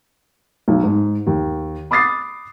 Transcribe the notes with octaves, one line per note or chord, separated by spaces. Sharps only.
B1
G#2
D#2
B5 D6 D#6 A6 C7